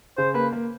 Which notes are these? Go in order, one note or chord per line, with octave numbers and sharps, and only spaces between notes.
C#3 C5
A#3 B4
A#3